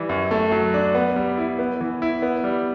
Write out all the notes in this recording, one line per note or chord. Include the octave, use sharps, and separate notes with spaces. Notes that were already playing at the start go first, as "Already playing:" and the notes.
Already playing: E3 G3
F#2
A3
F#3
D4
B3
G3
E4
B3
E3
E4
B3
G3